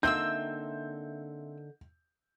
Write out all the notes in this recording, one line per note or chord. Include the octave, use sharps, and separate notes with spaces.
D3 A#3 C4 D#4 E5 E6 G6